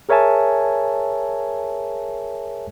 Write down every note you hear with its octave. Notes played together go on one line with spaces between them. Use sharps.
G#4 A#4 C#5 E5 G#5 A5